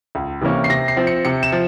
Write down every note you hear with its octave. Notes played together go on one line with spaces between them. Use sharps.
C#2
C3 E3 A#3 C#4
C7
C3 A#6
C7
F3 C4
C#7
C3 C#7
E7
F3